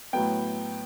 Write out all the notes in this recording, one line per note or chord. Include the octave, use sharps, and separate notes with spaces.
A2 F#3 B3 G5